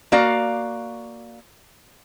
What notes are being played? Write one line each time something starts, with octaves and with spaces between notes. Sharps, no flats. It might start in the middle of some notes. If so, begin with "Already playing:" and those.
A#3 F#4 D5 F5